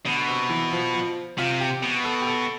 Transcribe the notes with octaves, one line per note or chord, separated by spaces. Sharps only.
B2 D3
C3
E3
F3
F3
C3 F4
G4
B2
A4
G4
A4